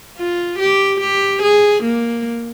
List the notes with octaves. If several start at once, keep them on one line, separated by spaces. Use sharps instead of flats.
F4
G4
G4
G#4
A#3